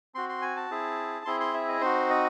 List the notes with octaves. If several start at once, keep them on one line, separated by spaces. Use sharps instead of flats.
C4 F#4 C6
C6
G#5
A5
C4 E4 G#4
C4 E4 G#4 C6
C6
E5
D#5
C4 D#4 F#4 C5
D#5